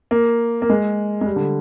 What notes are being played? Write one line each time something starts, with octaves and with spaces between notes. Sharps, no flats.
A#3
A#3
G#3
G#3
G3
D3